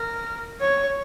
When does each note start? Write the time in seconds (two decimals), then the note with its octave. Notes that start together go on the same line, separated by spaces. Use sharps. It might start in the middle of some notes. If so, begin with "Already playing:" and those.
Already playing: A#4
0.60 C#5